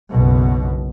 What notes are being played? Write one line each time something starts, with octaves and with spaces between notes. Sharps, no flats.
F#1 B1 B2